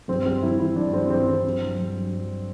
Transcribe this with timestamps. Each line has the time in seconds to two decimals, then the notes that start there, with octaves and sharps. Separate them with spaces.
0.08 G2 C4
0.25 G3 C4
0.42 G2 E4
0.59 E3 E4
0.76 G2 D4
0.93 G3 C4
1.10 G2 C4
1.27 E3 C4
1.44 F#3
1.61 G2
1.79 G2
1.95 F#3
2.12 F#3